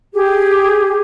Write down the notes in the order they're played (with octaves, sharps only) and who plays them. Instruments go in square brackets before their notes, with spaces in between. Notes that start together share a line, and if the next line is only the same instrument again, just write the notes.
[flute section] G4 G#4